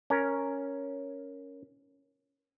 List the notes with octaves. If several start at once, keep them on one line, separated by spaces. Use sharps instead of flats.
C#4 A#4